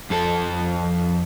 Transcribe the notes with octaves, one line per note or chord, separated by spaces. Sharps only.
F2 A4